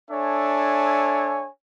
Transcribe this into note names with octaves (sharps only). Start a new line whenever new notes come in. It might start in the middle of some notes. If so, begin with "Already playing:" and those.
D4 A4 C#5 E5 G#5